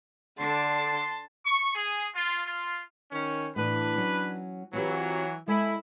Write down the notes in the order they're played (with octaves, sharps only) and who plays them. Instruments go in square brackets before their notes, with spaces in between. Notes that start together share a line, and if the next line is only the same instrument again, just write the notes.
[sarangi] D3 [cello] D4 A4 [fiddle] A5 [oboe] C6
[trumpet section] C#6
G#4
F4
F4
[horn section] D#3 C#4
[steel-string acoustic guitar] A2 E3 [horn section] D4 B4
[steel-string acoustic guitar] F#3 C#4
[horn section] E3 F#3 [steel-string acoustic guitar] C4 F4 G4
[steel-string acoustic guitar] G#3 A4 G#5 [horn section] E4